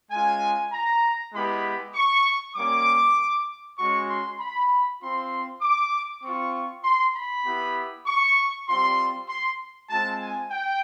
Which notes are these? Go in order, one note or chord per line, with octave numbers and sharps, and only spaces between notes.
G#3 C#4 F4 G#5
A#5
G#3 B3 E4 G4 B5
C#6
G3 A#3 C#4 D6
G#3 C#4 F#4 C#6
C6
B5
C4 F4 C6
D6
C4 F4 C#6
C6
B5
B3 E4 G4
C#6
G3 C4 F4 C6
C6
G#3 C4 F4 A5
G#5
G5